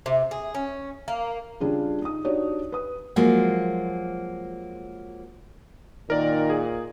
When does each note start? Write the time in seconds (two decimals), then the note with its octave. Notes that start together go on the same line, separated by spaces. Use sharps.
0.06 C3
0.31 G#4
0.55 C#4
1.08 A#3
1.61 C#3 G3 D4 F4 G#4
2.02 D#4 D#6
2.25 D4 D#4 F#4 G4 C#5 D5
2.72 B4 D#6
3.16 F3 F#3 G#3 A#3
6.10 A#2 D#3 A#4 D5
6.50 G#4